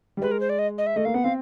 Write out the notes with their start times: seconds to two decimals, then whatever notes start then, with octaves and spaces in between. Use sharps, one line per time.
0.17 G3
0.22 G#3 B4
0.31 A#4
0.40 C5
0.49 D5
0.59 D#5
0.78 D#5
0.86 E5
0.96 A3 D#5
1.05 A#3 F5
1.14 B3 F#5
1.24 C4 F5